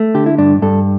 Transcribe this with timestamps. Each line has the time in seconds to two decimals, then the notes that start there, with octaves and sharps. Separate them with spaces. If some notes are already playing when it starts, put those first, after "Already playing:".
Already playing: A3
0.14 D3 G4
0.26 E4
0.38 G2 D4
0.62 G2 A4